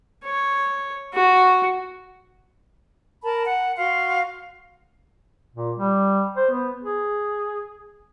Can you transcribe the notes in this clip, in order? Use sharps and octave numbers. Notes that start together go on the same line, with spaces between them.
C#5
F#4
A#4 A5 B5
F#5
F#4 F5 C6
A#2
G3
C5
B3
G#4